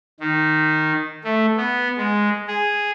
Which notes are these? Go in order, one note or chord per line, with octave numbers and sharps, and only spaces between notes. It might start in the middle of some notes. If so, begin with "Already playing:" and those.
D#3
A3
B3
G#3
G#4